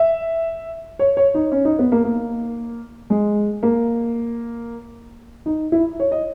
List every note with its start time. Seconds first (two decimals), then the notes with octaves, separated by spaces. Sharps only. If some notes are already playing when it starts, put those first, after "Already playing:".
Already playing: E5
0.99 C#5
1.17 C#5
1.35 D#4
1.52 C#4
1.65 D#4
1.79 B3
1.92 A#3
2.04 A#3
3.10 G#3
3.63 A#3
5.46 D#4
5.72 E4
6.00 C#5
6.12 D#5